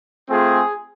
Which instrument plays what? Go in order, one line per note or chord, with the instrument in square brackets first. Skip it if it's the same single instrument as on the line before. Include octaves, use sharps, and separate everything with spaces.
[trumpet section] A3 C4 F4 G#4